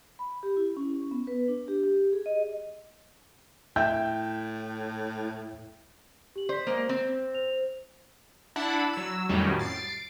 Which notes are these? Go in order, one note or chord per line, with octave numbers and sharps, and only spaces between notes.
B5
G4
E4
C#4
B3
B4
D4
G4
G4
G#4
D#5
A2 E5 G5 G6
G4 F#7
C5 D5 B6
G#3 A#3 C5
C4
C5 F7
D4 E4 F#5 A5 B5
F#3 E6
F2 A2 D#3 F#3 G3 C#4
A6 C7 D7